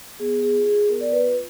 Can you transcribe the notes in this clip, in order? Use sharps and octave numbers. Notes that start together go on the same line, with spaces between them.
B3 G#4
G#4
F4
G#4
B3 A#4
D5
B4
F4